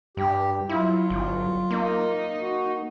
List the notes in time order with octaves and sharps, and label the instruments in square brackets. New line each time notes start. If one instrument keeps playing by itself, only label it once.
[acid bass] G2 [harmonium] G4
[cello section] F#3 [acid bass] E4 [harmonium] F4
[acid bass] G1
[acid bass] A#3 [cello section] D#4
[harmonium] F#4